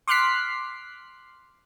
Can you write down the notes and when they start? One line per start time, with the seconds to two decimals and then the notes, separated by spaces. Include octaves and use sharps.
0.08 C6 D6 F6 F#6 B6 C7